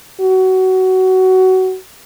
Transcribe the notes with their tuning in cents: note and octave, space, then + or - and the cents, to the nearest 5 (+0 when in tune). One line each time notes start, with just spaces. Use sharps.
F#4 +20